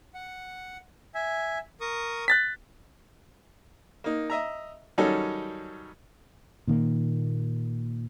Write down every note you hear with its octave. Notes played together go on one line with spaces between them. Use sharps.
F#5
E5 G#5
A#4 C#6 D#6
F#6 A6 B6
A#3 D#4
D#5 E5 A#5
D#3 F#3 G3 C#4 D#4 A4
A#2 D#3 A#3